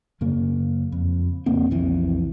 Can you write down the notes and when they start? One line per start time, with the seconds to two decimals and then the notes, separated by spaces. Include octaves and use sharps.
0.21 F#2 C#3 A#3
0.92 F2
1.46 F2 C#3 A#3 C4
1.71 B1 F2 C3 E3